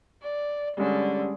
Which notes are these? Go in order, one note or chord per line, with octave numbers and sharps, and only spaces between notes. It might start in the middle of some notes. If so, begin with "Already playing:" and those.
D5
D3 G3 G#3 C#4